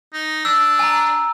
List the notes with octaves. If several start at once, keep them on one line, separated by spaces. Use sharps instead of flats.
D#4
D4 E6
G#5 A#5